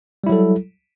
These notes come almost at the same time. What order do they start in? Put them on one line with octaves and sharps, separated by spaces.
G3 E4 F#3 A4